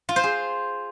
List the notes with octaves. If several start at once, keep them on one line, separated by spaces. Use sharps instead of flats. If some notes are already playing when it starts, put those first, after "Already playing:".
F4
C5
G#4